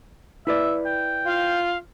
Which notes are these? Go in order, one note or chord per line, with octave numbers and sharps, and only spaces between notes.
E4 B4 D5 E5
G5
F4 F5